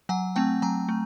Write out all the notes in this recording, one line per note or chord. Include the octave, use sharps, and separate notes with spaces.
F#3 F#5 G#5
A3 C4 G5 A5
F#3 G#5 A#5
A3